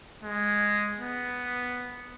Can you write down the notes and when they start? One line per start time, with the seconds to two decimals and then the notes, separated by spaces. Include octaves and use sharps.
0.23 G#3
0.97 B3